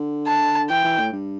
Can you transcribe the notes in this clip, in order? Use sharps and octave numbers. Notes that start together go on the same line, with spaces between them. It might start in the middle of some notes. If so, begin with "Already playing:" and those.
Already playing: D3
A5
E3 G5
E3
A2
G2